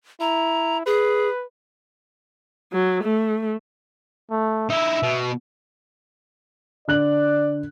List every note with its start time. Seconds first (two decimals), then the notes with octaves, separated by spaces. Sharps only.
0.21 E4 A#5
0.86 G#4 B4
2.73 F#3
3.04 A3
4.31 A3
4.70 D#4 E4 E5
5.03 B2
6.88 D3 D5 F#6 F#7